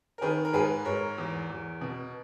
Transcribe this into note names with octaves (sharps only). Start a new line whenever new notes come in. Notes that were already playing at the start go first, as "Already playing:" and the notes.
A#4
D#3 G#4 B4
A#4
G#2 G#4 B4
G#2 A#4 C#5
E2
E2
B2